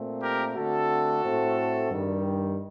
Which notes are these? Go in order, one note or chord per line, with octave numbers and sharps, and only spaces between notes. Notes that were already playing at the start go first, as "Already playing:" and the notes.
Already playing: A#2 A3 C4
G4 A#4
D3 A3 C4 F#4 A4
A2 A3 C4
G2 D#3 G3